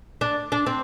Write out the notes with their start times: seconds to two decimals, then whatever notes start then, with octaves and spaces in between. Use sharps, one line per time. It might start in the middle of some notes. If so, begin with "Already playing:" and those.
0.21 D4
0.52 D4
0.66 C4